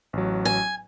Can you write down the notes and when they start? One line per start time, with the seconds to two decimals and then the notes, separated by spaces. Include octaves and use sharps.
0.13 A1 F#3
0.45 G#5